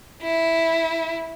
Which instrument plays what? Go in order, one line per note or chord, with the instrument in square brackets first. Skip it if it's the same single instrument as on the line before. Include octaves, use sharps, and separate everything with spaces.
[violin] E4